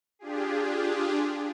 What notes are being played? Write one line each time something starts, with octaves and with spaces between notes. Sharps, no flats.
D4 F4 G4 G#4